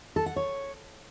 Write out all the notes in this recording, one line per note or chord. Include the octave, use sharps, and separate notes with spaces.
A4
F#5
C#5